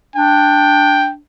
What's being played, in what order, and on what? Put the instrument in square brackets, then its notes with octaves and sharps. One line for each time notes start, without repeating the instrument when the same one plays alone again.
[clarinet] D4 [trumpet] G5